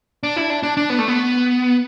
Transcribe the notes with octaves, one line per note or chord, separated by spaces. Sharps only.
D4
E4
D4
D4
D4
B3
A3
B3